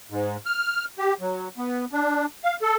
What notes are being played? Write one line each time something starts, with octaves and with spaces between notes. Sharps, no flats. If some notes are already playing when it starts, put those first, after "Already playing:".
G#2
F6
G4
F#3
B3
D4
F5
A4